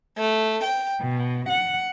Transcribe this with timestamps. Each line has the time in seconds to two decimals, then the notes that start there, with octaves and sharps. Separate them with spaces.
0.16 A3
0.62 G5
1.02 B2
1.48 F#5